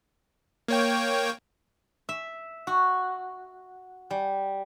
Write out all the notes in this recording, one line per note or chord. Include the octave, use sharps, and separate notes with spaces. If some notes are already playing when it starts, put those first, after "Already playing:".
A#3 C#5 G5
E5
F#4
G3